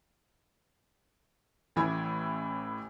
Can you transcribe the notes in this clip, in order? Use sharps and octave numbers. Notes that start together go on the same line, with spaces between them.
A1 A2 E3 E4 G#6